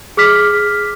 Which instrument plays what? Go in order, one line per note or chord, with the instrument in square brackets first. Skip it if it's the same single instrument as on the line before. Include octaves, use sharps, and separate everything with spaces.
[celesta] G#4 D6 F6 B6